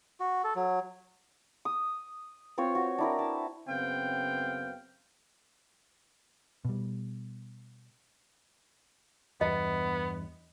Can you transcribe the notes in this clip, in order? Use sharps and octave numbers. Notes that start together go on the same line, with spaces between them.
F#4
A4
F#3
D#6
C4 F4 C#5
F#4
D4 E4 A#4
A5
F#2 C#3 B3 C4 F5 G5
B2 G3
E2 G2 B3 D#5